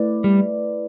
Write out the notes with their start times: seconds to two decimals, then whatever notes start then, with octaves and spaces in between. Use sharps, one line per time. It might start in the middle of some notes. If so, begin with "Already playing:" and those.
Already playing: A3 E4 B4 D5
0.24 G3